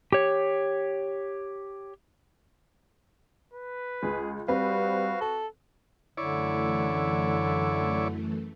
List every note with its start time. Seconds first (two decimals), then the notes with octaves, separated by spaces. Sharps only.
0.12 G4 C#5
3.53 B4
4.03 C#2 G#4
4.48 G3 C4 F#4 B4 F5
5.21 A4
6.17 F#2 D3 E3 A3 E4 C#5 D5